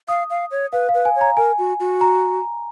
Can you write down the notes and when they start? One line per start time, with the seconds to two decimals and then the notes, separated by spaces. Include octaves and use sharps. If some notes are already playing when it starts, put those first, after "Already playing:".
0.08 F5 D#6
0.30 F5
0.51 C#5
0.73 B4 F5
0.89 F5
0.94 B4
1.05 G#5
1.16 C#5
1.21 A#5
1.37 A#4 G#5
1.58 F#4
1.80 F#4
2.01 A#5